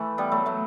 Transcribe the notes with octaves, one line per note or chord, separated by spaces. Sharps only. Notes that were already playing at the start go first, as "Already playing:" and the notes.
Already playing: E3 A3
G3 B3
F#3 A3
F#3 A3